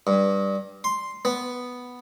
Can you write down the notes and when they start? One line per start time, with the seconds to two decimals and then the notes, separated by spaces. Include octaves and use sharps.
0.07 G2
0.84 C6
1.25 B3